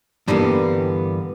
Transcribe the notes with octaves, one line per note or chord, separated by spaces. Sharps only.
G2 D3 E3 G3 A#3 B3